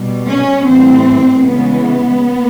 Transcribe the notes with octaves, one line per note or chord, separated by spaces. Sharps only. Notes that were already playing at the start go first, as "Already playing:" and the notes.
Already playing: B2 G3
C#4
A2 E3 G3 C4
C#3 E3 G#3 B3